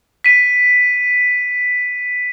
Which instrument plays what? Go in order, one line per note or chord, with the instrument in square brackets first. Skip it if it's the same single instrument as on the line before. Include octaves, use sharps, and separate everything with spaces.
[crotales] B6 D#7